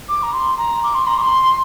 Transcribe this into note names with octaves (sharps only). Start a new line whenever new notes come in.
D6
A#5
C6
A#5
D6
C6
A#5
D6
C6